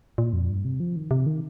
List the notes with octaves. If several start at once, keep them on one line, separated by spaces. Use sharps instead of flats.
A#2
F2
G2
C3
F3
D#3
C3
D#3